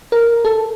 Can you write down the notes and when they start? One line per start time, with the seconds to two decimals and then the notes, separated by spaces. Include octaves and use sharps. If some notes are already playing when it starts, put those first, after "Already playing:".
0.12 A#4
0.45 A4